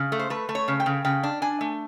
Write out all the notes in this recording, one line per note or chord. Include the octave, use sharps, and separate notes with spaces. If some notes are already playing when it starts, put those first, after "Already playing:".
Already playing: C#3
A3
C5
A3 B4
A3
C#5
C#3
G5
C#3
C#3 G5
D4
D4 G#5
A3